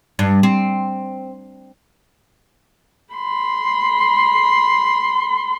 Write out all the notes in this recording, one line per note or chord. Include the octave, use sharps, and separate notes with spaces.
G2
C4
B5 C6